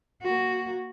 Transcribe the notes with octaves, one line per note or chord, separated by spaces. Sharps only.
A#3 F#4